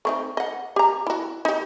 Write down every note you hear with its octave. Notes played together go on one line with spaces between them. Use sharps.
A3 C4 D#4
D#5 F#5
G4 A#5
E4 F#4
D#4 G4